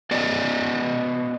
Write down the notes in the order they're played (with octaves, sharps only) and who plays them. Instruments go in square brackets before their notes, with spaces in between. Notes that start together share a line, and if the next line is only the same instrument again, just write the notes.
[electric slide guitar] B3 F#4 D5 D#5